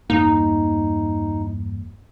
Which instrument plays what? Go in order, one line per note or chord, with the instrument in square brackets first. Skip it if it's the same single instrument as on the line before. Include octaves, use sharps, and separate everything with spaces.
[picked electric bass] E2 G2 A#3 [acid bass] D#4